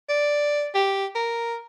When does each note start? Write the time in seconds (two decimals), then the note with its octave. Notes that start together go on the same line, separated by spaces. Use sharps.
0.09 D5
0.75 G4
1.15 A#4